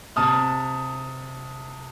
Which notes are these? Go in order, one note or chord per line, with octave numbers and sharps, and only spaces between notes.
C3 A5 D#6 F6